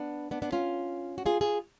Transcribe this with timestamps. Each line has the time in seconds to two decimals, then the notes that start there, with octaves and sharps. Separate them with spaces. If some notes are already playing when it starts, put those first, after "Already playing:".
Already playing: B3 D4
0.31 B3 D4
0.42 B3 D4
0.52 C#4 F4
1.18 F#4
1.26 F4 G#4
1.41 F4 G#4